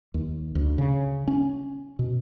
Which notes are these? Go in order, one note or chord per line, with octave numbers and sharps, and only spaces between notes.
D#2
D2
C#3
C#4
B2